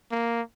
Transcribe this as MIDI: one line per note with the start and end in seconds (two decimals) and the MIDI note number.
0.11 0.41 58